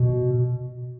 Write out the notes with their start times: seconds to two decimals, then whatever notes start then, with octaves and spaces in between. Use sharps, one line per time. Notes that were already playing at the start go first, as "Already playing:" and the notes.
Already playing: B2